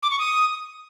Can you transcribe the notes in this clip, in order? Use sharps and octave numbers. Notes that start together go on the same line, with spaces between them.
D6
C#6
D#6